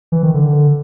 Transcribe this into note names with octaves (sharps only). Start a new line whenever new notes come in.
E3
D#3
D3